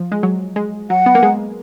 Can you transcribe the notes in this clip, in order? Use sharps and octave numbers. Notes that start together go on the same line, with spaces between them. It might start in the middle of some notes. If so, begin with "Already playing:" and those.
Already playing: F3
G#3
F#3
G#3
F#3 F#5
B3
A#3
G#3